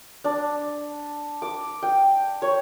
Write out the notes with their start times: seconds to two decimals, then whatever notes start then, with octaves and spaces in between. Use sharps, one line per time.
0.24 D4
1.42 D6
1.83 G5
2.42 C#5